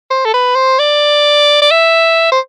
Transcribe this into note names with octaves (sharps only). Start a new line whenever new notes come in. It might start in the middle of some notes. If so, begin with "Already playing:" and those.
C5
A4
B4
C5
D5
D5
E5
C5